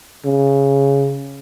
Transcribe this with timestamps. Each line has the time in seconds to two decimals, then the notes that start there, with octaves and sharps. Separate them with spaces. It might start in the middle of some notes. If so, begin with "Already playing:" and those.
0.25 C#3